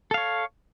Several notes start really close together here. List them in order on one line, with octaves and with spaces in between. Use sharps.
A4 F5 C#5